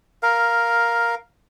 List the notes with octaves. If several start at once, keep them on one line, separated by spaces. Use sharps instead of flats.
A#4 F5